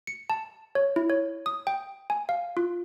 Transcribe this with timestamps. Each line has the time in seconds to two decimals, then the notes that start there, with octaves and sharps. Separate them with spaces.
0.07 C#7
0.30 A5
0.75 C#5
0.96 E4
1.10 C#5
1.46 D#6
1.67 G5
2.10 G#5
2.29 F5
2.57 F4